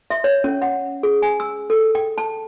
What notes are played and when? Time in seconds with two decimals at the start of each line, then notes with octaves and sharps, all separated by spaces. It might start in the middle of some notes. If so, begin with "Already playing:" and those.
0.10 E5
0.24 C#5
0.44 C#4
0.62 F#5
1.03 G#4
1.22 G#5
1.40 E6
1.70 A4
1.95 G5
2.18 A5